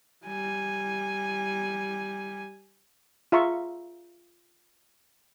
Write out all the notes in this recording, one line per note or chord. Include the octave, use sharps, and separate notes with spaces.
G3 G#5
F4 G#4 E5 A#5 C6 C#6